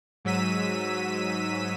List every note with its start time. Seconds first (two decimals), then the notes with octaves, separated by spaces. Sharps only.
0.25 G#2 F#3 E6 B6 D#7